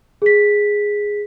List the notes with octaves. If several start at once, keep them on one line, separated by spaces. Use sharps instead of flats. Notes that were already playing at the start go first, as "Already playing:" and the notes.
G#4 B6